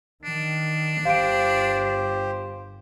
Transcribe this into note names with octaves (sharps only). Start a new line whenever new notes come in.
D#3 D4
G1 G4 C5 F5 D7